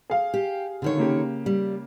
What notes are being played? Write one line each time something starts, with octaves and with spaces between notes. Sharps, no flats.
G#4 F5
G4
D3 D#3 C#5
C#3 A#3 G4
G3